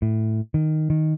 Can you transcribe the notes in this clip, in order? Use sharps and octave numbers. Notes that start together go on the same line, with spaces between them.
A2
D#3
D#3